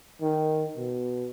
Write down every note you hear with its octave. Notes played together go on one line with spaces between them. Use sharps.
D#3
B2